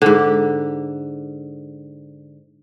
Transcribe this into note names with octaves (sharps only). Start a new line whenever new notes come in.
G#2 D3